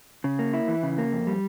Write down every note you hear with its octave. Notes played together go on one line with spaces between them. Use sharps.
C#3
A#3
E4
E3
C#3
A#3
F2
G3